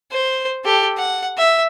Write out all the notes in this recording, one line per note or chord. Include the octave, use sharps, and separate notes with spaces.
C5
G4 A4
F#5
E5